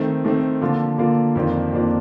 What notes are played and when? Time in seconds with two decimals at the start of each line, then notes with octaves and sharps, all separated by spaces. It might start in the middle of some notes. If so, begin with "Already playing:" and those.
Already playing: D#3 A3 C4
0.24 D#3 A3 C4
0.61 D3 F3 A#3 F4
0.98 D3 F3 A#3 F4
1.36 F2 D#3 A#3 D4 F4
1.73 F2 D#3 A#3 D4 F4